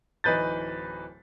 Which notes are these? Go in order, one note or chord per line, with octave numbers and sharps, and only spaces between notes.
D1 E3 D#4 B4 G6 A6